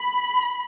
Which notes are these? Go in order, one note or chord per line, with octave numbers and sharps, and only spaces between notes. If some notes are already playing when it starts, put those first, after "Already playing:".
Already playing: B5